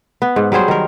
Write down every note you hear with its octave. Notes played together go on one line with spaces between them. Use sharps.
B3
G#2
F#3 G3 G#4 C5
D#3 A#4